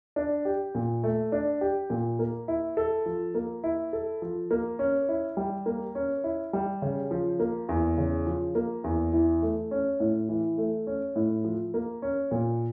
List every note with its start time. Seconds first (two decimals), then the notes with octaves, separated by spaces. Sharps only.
0.16 D4
0.45 G4
0.75 A#2
1.04 A3
1.32 D4
1.61 G4
1.90 A#2
2.19 A#3
2.48 E4
2.77 A4
3.06 F3
3.35 A#3
3.64 E4
3.93 A4
4.22 F3
4.51 A#3
4.79 C#4
5.09 E4
5.37 G3
5.66 A#3
5.95 C#4
6.24 E4
6.53 G3
6.82 C#3
7.11 F3
7.40 A#3
7.69 E2
7.97 C#3
8.27 F3
8.55 A#3
8.84 E2
9.13 E3
9.42 A3
9.71 C#4
10.00 A2
10.29 E3
10.58 A3
10.87 C#4
11.16 A2
11.45 F3
11.74 A#3
12.02 C#4
12.31 A#2